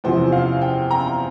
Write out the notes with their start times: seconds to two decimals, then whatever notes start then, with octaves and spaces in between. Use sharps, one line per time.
0.04 E2 C3 F3 C5
0.32 F5
0.62 G5
0.91 A#5